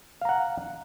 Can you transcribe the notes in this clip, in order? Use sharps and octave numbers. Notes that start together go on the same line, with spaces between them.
F5 F#5 A#5